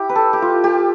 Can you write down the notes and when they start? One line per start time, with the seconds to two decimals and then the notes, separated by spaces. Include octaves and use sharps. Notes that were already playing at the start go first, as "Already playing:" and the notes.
Already playing: E4 G4
0.09 B4
0.16 A4
0.33 G4
0.42 F4
0.64 G4